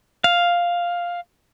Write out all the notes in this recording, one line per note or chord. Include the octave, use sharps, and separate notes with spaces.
F5